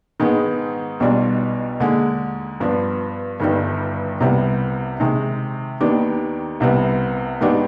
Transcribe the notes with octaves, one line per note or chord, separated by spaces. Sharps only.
G#2 D#3 G#3 B3
B1 B2 G3 D4 F4
D#2 D3 G#3
G2 F3 B3 D4
G1 G2 D#3 G3
C2 C3 G3 B3
C3 D#3 G#3
D#2 D#3 B3 D4 G4
C2 C3 G3 B3
G#2 D#3 B3 D4 G4